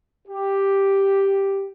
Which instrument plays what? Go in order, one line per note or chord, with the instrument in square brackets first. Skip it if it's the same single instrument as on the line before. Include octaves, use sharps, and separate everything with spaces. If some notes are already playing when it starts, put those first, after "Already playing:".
[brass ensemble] G4